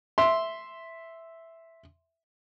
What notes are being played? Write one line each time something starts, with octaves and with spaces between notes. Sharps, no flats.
E5 C6